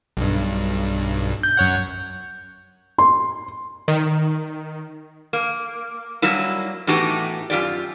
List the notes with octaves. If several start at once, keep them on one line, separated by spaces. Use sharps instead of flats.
B1 G2
G6
F#2 C#5 F#5
C6
D#3
A#3
F#3 G3 A#3 E4
A2 E3 B3 D#4 F#4 G4
F#2 F4 G4 D5